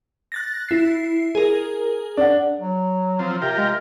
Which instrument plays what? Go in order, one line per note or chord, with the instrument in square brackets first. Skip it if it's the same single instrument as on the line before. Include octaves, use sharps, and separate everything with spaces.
[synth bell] F#6 A6 A#6
E4 C7
G#4 A#4
[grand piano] D4 F#5
[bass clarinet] F#3
[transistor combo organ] F3 C4
[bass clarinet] C3 [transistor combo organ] F4 G4 A#4
[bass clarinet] G#3